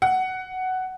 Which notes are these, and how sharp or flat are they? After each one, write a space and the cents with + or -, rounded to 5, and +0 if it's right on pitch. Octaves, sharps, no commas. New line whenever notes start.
F#5 +10